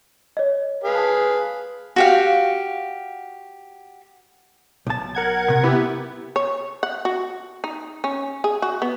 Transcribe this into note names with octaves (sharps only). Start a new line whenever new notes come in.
C#5 D#5
G#4 B4 F5
A5
F#4 G4 F5
B1 A5
A#4 F#5 G#6
C3
B3 E4 G4
C#5
F#5
F#4
D#4
C#4
G#4
F#4
B3